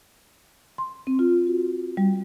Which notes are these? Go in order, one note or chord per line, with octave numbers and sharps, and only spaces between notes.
C6
C4
F4
F#4
G3